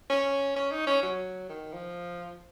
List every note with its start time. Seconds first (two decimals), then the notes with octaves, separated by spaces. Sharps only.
0.10 C#4
0.56 C#4
0.72 D#4
0.87 C#4
1.03 F#3
1.49 D#3
1.73 F3